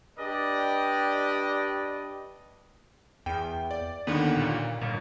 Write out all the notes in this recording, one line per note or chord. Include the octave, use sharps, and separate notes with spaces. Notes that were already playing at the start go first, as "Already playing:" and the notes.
D4 G4 B4 D5 D#5
E2 G5
D5
D#2 D3 D#3 B3
A#2
G1 A#2